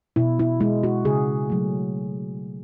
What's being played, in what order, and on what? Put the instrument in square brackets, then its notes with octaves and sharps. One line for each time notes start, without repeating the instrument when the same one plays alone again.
[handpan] B2 E4
E4
G#3 E4
F#4
C#3 G#4
F#3 A3